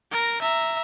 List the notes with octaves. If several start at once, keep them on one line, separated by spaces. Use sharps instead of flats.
A#4 A#6
E5 A#5